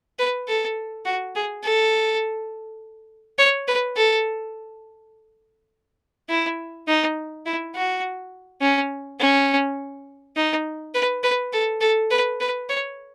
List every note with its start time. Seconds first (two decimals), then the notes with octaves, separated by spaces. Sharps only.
0.19 B4
0.48 A4
1.05 F#4
1.35 G#4
1.63 A4
3.38 C#5
3.67 B4
3.97 A4
6.29 E4
6.87 D#4
7.45 E4
7.75 F#4
8.61 C#4
9.20 C#4
10.36 D#4
10.94 B4
11.23 B4
11.53 A4
11.81 A4
12.11 B4
12.40 B4
12.69 C#5